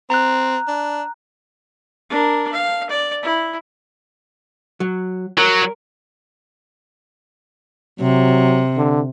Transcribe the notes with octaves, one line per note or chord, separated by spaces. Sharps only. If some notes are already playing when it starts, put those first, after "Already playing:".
C4 A#5 F#6
D4
D4 A#4
F5
D5
E4
F#3
F#3 A#4
C3 F#3
D3